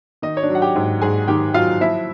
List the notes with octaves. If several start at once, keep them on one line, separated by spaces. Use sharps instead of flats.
D#3 D#4 D#5
C#5
D4 D5
F#3
F#5
G4 G5
G#2
G#2 G#4 G#5
D#3 G4 G5
F#3 F4 F5
F3 E4 E5